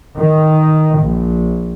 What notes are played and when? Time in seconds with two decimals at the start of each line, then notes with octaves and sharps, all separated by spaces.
0.16 D#3
1.01 A#1